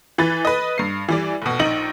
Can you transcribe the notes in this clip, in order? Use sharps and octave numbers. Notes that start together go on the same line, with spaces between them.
E3 B4 A6
B4 D#5
G2 C7
E3 G3 D5
F1 B2
A#1 D#4 F#7